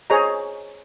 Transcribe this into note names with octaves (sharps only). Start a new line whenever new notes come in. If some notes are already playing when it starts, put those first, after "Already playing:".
G#4 C5 C#5 D#5 A#5